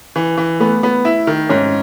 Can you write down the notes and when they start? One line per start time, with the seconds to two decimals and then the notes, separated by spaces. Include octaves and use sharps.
0.16 E3
0.37 E3
0.60 A3 B3
0.83 B3
1.05 E4
1.27 D#3
1.49 G#2 C#4